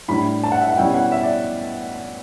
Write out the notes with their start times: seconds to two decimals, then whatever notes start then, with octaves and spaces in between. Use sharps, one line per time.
0.08 A2 G3 D4 B5
0.44 A5
0.52 F#5
0.61 E5
0.70 F#5
0.77 B2 G3 C#4 E4 G5
0.95 F#5
1.12 E5
1.23 D5